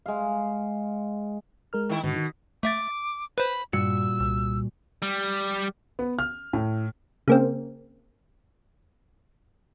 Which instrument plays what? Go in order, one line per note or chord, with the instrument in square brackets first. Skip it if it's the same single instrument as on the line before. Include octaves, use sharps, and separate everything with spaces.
[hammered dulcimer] G#3 F5
[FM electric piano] G#3 A#4 F6
[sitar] D#3 E4
[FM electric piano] G#2 D3 D#3 [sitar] B2
[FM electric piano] D#3
[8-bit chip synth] A3 E5 A6 [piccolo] D6
[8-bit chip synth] B4 C5 [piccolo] B5
[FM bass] G2 [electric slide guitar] A#2 G3 F#4 [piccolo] E6 [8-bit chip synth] C#7
[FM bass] C2
[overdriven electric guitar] G3
[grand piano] B3
F6
A2
[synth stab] C#3 A#3 C4